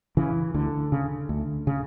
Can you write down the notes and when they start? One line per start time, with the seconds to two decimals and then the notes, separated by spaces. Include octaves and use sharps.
0.17 C#3 E3
0.54 D2 D3
0.92 C#3
1.29 D2
1.67 C#3